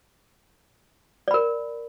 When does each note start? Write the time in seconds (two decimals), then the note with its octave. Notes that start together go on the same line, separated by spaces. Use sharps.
1.28 D5
1.31 B5
1.34 A#4